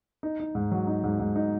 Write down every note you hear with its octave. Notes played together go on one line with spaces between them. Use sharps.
D#4
D#4
G#2
F#3
D#4
G#2
G#2
D#4